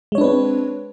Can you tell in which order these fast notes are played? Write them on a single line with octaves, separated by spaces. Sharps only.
G#3 C#5 D4 B4 C4